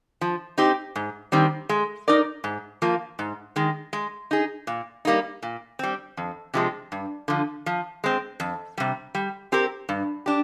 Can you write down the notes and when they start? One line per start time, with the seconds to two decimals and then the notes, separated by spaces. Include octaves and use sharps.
0.21 F3
0.58 C4 D#4 G4
0.96 G#2
1.32 D#3 G3 C4
1.69 G#3
2.08 D#4 A#4 D5
2.44 G#2
2.82 F3 A#3 F4
3.19 G#2
3.56 D#3 G#3
3.93 G#3
4.31 D#4 G#4
4.67 A#2
5.05 G3 A#3 D#4
5.42 A#2
5.79 G3 C4
6.17 F2
6.54 C3 F3 G#3
6.92 G2
7.28 D3 F3
7.66 F3
8.04 G#3 C4
8.40 F2
8.78 C3 G3
9.15 G3
9.52 C4 G4 A#4
9.89 G2
10.26 D4 G4